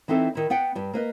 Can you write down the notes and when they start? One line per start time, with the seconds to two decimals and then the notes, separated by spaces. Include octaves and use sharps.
0.08 E3 C4 D#4 E4 A4
0.35 D#3 E4
0.50 B3 F#5 G5
0.75 G2 G3
0.93 A#3 B4 D#5